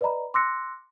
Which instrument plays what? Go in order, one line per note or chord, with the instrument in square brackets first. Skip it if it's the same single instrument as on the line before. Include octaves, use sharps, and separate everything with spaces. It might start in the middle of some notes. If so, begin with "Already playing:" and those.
[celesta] B4 D5 D#5 A#5 B5
C6 D6 E6 F#6 A#6 C#7